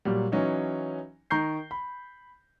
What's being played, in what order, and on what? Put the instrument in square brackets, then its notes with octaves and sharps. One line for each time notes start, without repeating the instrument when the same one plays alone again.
[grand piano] A#2 F#3 G3
E3 F#3 C#4 D#4
D#3 A#5 C#6 G6 C7
B5